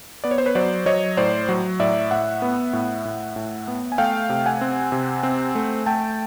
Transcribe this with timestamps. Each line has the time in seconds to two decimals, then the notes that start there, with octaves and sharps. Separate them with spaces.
0.24 B3 D5
0.31 C#5
0.38 C5
0.46 B4 C#5
0.55 F#3 C5 D5
0.86 F#3 C#5 D#5
1.17 A2 C5 D5
1.49 F#3
1.80 A2 D5 E5
2.11 A2 E5 F#5
2.42 B3
2.73 A2
3.05 A2
3.36 A2
3.68 B3
3.92 G#5
3.98 A3 F5 G5
4.29 C3
4.46 F#5 G#5
4.61 C4
4.92 C3
5.23 C4
5.55 A3
5.86 A3 G5 A5